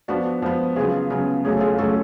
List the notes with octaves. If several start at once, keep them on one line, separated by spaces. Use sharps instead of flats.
F3 B3 D4 F#4
F3 B3
C#3 F#3 B3 F4 G#4
C#3 F#3 B3
C#3 F#3 A3 C#4 G#4
A4
F4 G#4
C#3 F#3 A3 C#4 F#4 A4